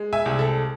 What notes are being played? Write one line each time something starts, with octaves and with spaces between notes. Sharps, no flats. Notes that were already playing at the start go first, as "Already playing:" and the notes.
Already playing: G#3
E5 G#5
C2
A4